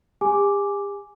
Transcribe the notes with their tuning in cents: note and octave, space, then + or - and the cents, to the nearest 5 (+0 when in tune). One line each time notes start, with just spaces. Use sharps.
G4 +45 G#5 +0 D6 +0